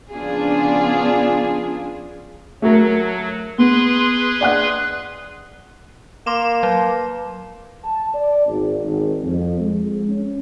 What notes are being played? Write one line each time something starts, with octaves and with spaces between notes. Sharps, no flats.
C#3 F3 B3 D4 F4 G#4
F#3 A3 F#4 A#4
B3 G#4 B4 C6
D5 F#5 F#6
A#3 C6 D6 E7
F#3
A5
D5
G#1
G#1
F2
G#3
C#4